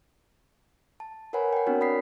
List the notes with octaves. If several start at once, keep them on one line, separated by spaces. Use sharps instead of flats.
A5
A#4 B4 C#5 F#5 G#5 B5
F#5 G5
B3 C4 D4 F#4 A#4 C#5
D5 B5 D#6 B6 C7